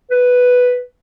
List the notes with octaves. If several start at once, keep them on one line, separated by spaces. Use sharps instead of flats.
B4